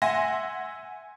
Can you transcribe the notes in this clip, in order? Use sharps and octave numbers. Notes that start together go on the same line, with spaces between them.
E5 F#5 G#5 C6 A#6